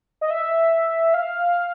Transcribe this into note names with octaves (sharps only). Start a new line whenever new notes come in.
D#5
E5
F5